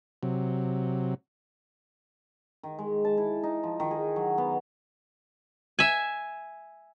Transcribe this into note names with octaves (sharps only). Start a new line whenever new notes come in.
C3 F#3
D#3
G#3
A5
E4
D#4
F3
D#3
G#4
F#3
B3
E5 G#5